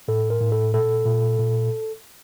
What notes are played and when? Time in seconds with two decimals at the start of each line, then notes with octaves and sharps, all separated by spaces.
0.08 A2 A4
0.30 A#4
0.41 A2
0.52 A4
0.73 A#2 A4
1.06 A#2
1.39 A#2